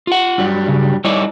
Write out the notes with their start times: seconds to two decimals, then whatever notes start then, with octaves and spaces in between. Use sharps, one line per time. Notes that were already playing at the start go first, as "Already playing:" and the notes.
0.07 F4 F#5
0.38 G2 F#3 G3
0.68 C#3
1.04 G3 D#4 E4 C#5 D5